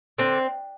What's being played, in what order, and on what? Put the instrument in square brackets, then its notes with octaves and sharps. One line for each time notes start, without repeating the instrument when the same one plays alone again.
[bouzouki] D3 C4